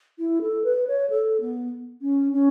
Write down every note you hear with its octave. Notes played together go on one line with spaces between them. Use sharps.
E4
A4
B4
C#5
A4
B3
C#4
C#4